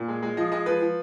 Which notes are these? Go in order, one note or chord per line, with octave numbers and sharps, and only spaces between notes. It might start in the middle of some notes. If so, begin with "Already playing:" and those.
Already playing: A#2
G#3
G#3
F3 D#5
G#3 D#5
F3 B4
F3